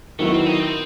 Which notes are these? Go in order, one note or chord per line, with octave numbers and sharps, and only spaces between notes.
D#3 F#3 A3 B3 E4
C4
D#4
C4